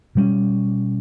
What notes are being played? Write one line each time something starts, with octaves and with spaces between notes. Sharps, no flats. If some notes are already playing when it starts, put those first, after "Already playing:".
B2 G3 A#3 C#4